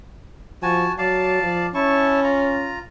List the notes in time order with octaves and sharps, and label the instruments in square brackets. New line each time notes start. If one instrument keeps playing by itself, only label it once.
[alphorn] F3 [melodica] F#4 G#5 A5
[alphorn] F#3 [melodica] D5 F5 A5
[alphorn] F3
[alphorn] C#4 [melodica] E4 A5 C#6
[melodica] F4 A#5